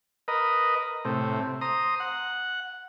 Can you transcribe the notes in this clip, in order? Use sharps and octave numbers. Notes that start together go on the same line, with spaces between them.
A#4 B4 D#5
A2 C3
C5 A#5 D#6
F#5